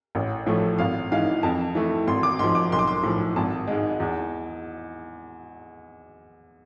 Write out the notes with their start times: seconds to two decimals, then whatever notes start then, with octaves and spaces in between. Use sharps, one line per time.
0.15 A1
0.46 A2 F3 A3
0.79 G#1 F5
1.12 G#2 E3 F5
1.43 F2 A5
1.75 E3 A3
2.07 G#1 C6
2.23 D6
2.39 G#2 F3 C6
2.55 D6
2.72 B1 C6
2.79 D6
2.88 C6
3.03 A2 F3
3.36 G#1 A5
3.67 G#2 G#3
4.00 E2